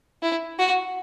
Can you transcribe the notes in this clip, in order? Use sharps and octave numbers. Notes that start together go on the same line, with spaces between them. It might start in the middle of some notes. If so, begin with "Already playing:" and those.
E4
F#4